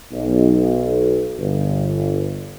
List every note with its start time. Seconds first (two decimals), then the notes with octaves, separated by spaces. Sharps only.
0.12 B1
1.38 G1